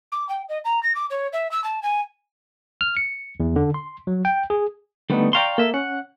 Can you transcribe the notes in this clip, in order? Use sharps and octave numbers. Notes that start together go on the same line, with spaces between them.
D6
G5
D#5
A#5
A#6
D6
C#5
E5
E6
A5
G#5
F6
C#7
E2
D3
C6
F#3
G5
G#4
D3 G3 A3 B3 D#4
D5 F5 G5 A#5 C6 C#6
A#3 A4 E5
C#4 F#5